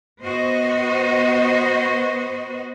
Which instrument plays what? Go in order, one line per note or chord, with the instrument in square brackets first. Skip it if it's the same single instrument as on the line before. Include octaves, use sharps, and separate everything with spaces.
[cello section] B3 F#4 C5 D#5